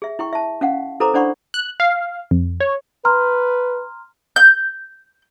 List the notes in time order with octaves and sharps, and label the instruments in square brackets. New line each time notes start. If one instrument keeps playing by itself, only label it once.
[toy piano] G#4 E5
E4 G5 C#6
E5 A5
C#4 F5 F#5
E4 A4 B4 C5 A#5 D6
D4 C5 D5 F#5 B5 C#6
[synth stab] F#6
F5
F2
C#5
[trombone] B4 [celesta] A#5 C6 F6
[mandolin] G6